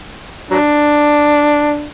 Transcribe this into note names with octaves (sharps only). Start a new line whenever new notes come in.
F#3 D4